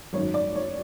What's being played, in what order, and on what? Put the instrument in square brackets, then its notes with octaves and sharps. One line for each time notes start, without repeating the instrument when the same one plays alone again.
[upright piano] G#1 F#2 D#3 C#5
D5
C#5